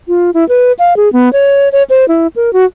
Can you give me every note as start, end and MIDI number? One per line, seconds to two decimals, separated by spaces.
0.08 0.31 65
0.34 0.47 64
0.49 0.72 71
0.79 0.96 77
0.97 1.11 68
1.13 1.31 59
1.33 1.69 73
1.72 1.83 73
1.90 2.07 72
2.08 2.27 64
2.36 2.53 70
2.53 2.65 66